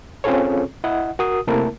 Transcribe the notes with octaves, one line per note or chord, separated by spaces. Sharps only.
C4 C#4 F4 G#4 A4 C#5
E4 D#5 F#5
F#4 A#4 D#6
C3 A3 A#3 E4 A#4 A5